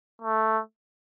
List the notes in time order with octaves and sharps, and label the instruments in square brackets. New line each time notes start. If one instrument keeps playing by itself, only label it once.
[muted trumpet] A3